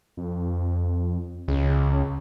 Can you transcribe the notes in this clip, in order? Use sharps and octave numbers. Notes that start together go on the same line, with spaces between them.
F2
C#2 C#3